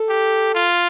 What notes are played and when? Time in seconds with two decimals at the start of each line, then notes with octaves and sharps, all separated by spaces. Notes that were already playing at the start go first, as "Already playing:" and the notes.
Already playing: A4
0.09 G4
0.55 F4